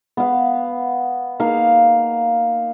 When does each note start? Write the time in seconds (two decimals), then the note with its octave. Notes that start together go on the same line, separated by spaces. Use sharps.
0.17 B3 F5
1.40 A#3 D#4 F5